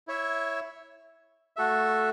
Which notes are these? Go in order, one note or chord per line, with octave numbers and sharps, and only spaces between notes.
E4 C#5 E5
A3 F#4 A4 E5